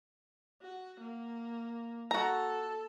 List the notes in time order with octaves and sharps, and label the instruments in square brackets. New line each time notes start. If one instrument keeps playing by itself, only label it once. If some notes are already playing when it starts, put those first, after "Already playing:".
[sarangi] F#4
A#3
[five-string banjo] F#4 A#5 [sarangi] A4